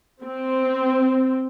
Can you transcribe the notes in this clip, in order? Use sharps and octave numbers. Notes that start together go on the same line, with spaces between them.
C4